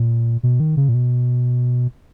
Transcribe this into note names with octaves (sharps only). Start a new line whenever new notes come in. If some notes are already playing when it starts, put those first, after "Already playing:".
Already playing: A#2
B2
D#3
C#3
A#2
B2